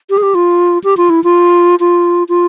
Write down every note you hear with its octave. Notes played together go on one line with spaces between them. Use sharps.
G4
G#4
G4
F4
G4
F4
E4
F4
F4
F4